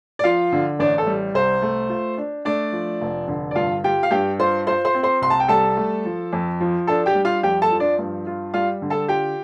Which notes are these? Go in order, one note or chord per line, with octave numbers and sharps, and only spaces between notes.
D5
F3 F4 F5
D3
A1 D4 D5
A4
G3
C2 C5
A3
F4
D4
A3 D4 D5
F3
F1
D3
D5
G2 F4 F5
F4 G4 G5
F5
G2 G4 G5
F4 C5 C6
F4 C5 C6
C5 C6
C4
C5 C6
C2 C6
A5
G5
G3 A4 A5
A3
F3
F2
F3
D4 A4 A5
G4 G5
G3
F4 F5
F2 G4 G5
A4 A5
F3
D4 D5
G2
F4
G3 F4 F5
D3
A4 A5
F4 G4 G5